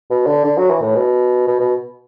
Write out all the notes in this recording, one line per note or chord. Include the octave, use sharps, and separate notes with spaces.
B2
D3
D3
F#3
E3
A2
B2
B2
B2